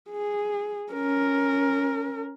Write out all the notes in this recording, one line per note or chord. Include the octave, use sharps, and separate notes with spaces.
G#4
C#4 A#4